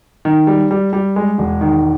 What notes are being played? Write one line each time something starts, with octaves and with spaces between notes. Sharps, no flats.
D#3
G3
G3
G3
G#3
E1
D#3